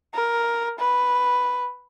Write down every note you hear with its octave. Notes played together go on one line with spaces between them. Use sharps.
A#4
B4